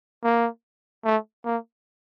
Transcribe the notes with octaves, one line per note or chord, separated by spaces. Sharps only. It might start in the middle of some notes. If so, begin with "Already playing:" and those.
A#3
A3
A#3